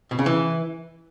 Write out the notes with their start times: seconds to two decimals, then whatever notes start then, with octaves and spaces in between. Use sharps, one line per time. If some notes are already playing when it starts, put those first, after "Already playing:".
0.11 B2
0.19 C#3
0.26 E3